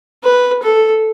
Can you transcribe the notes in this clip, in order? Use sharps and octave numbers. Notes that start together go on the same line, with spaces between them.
B4
A4